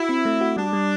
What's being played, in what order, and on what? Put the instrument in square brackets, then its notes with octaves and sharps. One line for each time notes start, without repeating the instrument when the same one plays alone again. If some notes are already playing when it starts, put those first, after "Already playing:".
Already playing: [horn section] E4 [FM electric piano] F#4
[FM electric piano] C4
A3
F#4
[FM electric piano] G3 [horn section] D4
[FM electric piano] G3